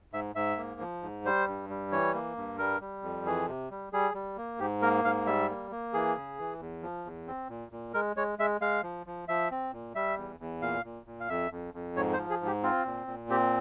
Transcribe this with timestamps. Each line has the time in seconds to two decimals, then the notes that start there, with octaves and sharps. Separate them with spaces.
0.13 G#2 E5
0.35 G#2 E5
0.57 A#3
0.81 F3
1.03 G#2
1.25 G3 C5
1.48 G2
1.70 G3
1.91 E3 C#5
2.14 A#3
2.37 G2
2.58 G3 A#4
2.81 G3
3.03 F2
3.26 E3 G#4
3.48 C3
3.71 G3
3.93 G3 G#4
4.14 G3
4.37 A#3
4.59 G#2 G4
4.82 A#3 A#4
5.04 G#2 F5
5.26 G3 E5
5.49 A#3
5.71 A#3
5.93 E3 G#4
6.16 C#3
6.39 E3
6.60 E2
6.82 F3
7.05 E2
7.28 C4
7.49 A#2
7.72 A#2
7.94 G#3 A#4
8.16 G#3 C#5
8.39 G#3 E5
8.61 G#3 F5
8.83 F3
9.06 F3
9.28 F3 E5
9.51 C4
9.72 A#2
9.95 G3 E5
10.17 E2
10.40 E2
10.62 A#2 F5
10.84 A#2
11.06 A#2
11.20 F5
11.29 F2 E5
11.51 F2
11.74 F2
11.96 G#2 C#5
12.13 C5
12.18 F3
12.30 G#4
12.41 G#2
12.47 G4
12.63 C4 F4
12.86 A#2
13.07 A#2
13.30 C4 G4